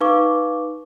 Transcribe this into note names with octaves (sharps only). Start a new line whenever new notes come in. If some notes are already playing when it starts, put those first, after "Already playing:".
D#4 B4 F5 C#6 D6